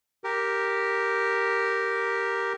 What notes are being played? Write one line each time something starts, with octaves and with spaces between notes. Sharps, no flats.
G4 A#4